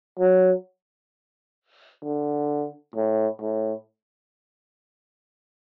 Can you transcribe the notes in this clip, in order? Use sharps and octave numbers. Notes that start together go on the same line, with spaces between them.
F#3
D3
A2
A2